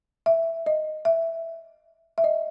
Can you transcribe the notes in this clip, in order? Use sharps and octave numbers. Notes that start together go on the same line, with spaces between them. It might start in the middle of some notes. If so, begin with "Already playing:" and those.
E5
D#5
E5
E5
D#5